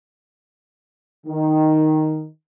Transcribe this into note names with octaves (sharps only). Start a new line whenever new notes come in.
D#3